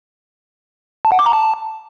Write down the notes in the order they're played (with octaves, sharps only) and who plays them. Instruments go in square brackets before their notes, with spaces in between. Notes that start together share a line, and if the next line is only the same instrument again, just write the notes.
[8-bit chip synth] A5
F#5
D6
A#5
A5